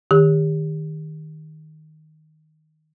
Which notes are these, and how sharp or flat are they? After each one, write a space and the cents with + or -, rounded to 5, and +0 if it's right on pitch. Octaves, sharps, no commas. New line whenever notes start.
D#3 +0 G4 +35